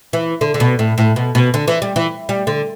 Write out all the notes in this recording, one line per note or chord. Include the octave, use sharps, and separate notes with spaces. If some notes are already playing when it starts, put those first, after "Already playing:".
E3
D3
D3
B2
A2
A2
B2
B2
D3
E3
G3
E3
G3
D3